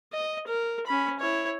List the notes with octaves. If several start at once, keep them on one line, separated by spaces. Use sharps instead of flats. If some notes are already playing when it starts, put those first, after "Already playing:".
D#5
A#4
C#4 B5
E4 C#5